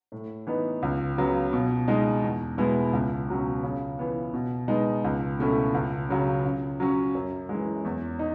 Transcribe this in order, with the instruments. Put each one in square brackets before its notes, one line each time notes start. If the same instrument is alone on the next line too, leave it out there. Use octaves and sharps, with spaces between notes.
[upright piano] A2
E3 B3 D#4
C#2
C#3 F#3 B3
B2
G#3 D#4
E2
B2 G#3 B3 E4
C#2
B2 F#3 C#4
C#3
E3 B3
B2
G#3 B3 D#4
C#2
B2 A3 C#4 E4
C#2
C#3 F#3 C#4
C#3
F#3 C#4
F#2
G#3
E3
E2
D#4